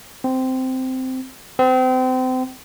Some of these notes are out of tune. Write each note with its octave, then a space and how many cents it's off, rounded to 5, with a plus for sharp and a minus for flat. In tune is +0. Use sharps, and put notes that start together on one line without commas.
C4 -10
C4 -30